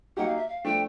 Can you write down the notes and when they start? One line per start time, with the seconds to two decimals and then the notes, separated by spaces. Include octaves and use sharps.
0.17 F#3 A#3 D#4 G4 F#5
0.27 F5
0.37 E5
0.49 F5
0.64 F3 A3 D4 G5